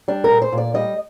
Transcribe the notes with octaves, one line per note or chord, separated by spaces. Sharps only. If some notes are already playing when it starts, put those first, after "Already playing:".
G3 D4
A#4
A#2
C5
A#2
D5
G3 D#5